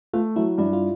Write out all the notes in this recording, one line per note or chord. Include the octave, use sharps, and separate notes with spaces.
A3 F4
F#3 E4
G2 E4
F4